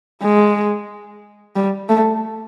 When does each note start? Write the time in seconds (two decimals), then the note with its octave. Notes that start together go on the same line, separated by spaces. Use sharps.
0.22 G#3
1.56 G3
1.89 A3